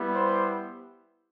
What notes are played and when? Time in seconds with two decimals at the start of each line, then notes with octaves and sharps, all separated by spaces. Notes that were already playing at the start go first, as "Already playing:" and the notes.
Already playing: G3 B3 E4 G4
0.13 C5